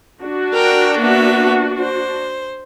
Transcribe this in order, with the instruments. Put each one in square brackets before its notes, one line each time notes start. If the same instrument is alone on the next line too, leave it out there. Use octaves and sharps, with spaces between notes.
[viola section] D4 F#4
[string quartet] A#4 G5
A#3 B3 E5
C5